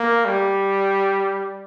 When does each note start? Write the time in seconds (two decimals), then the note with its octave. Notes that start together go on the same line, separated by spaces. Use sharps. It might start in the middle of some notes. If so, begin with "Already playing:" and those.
Already playing: A#3
0.25 G3